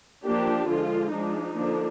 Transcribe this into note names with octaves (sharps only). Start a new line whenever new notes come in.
F3 A#3 D4 G4
D3 F3 G#3 F4
F3 G#3 D4 D#4
D3 F3 A#3 D4